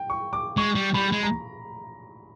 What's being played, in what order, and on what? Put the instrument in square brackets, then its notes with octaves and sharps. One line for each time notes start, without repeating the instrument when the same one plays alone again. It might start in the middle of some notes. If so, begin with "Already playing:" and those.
Already playing: [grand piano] G5
C#6
D6
[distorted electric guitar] G#3 [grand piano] C#6
[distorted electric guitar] G3
[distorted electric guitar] G3 [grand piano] B5
[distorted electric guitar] G#3
[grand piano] A#5